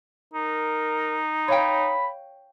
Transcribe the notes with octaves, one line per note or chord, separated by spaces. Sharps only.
D#4 A#4
C#5 F5 G5 B5